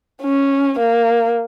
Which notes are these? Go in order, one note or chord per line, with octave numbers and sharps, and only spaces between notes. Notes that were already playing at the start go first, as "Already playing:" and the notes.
C#4
A#3